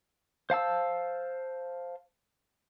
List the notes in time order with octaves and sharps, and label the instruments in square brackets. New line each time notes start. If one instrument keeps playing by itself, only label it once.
[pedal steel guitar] C5 F5 A5 E6